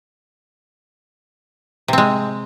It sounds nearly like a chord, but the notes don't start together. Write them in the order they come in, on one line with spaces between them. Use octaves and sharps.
C3 C4 G#3